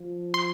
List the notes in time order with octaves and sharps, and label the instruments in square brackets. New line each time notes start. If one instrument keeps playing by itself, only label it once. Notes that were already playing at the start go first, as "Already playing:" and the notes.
Already playing: [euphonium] F3
[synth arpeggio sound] C6